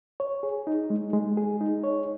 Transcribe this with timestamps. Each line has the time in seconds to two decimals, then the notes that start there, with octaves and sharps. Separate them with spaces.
0.20 C#5
0.43 G#4
0.67 D#4
0.90 G#3
1.13 G#3
1.37 G#4
1.61 D#4
1.84 C#5